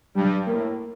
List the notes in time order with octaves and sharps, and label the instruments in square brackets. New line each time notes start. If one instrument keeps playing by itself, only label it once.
[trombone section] G2 [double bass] G3
[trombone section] A2 [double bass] A#3